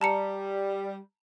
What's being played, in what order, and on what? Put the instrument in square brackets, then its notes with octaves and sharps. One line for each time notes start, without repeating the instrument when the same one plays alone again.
[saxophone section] G3 [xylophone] A5 A#5 C#7